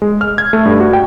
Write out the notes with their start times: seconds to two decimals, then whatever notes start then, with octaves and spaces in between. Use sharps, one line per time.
0.02 G#3
0.21 F6
0.38 G#6
0.53 A3
0.65 G2
0.80 F#4
0.93 G5